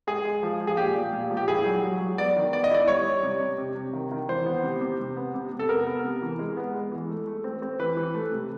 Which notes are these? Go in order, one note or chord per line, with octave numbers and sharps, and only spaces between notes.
G#3 G#4
G#3
F3
F3
G#4
A#2 G4
A#2
A#2
F3
G4
E4 G#4
F#3
F#3
F#3
B3 D5
D#3
B3 D5
D#5
E4 D5
G3 C#5
G3
C3
C3
C3
C3
D#3
D#3
E3 C5
B3
C3
C3
C3
B3
C3
C3
A4
B3 A#4
B3
C3
E3
G#3
B3
G#3
E3
A3
A3
C4
C4
E3 B4
E3
A3
C3